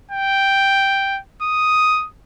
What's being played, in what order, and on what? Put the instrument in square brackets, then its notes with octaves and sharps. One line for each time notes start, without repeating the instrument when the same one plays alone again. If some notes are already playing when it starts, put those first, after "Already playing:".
[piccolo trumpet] G5
D#6